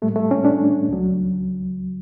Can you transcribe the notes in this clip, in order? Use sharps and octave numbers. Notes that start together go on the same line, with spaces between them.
A2 G3 A3
A3
C#4
D4
C#2 C#3 F#3